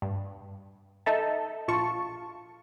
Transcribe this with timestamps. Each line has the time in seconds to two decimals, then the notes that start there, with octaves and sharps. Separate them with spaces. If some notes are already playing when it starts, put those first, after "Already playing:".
0.02 G2
1.06 D#4 A4 E5 A5
1.68 A#1 F4 A5 C#6